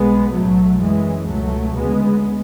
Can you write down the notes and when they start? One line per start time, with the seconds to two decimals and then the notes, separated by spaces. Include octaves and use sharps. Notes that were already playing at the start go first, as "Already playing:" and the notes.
Already playing: B1 B2 G#3 B3
0.33 B1 A2 F#3 A3
0.81 F#1 F#2 C#3 E3 G#3
1.28 C#2 B2 F#3 A3
1.76 D2 C#3 G#3 B3